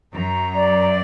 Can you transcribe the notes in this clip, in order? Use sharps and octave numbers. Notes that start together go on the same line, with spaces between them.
F#2 A#5
D5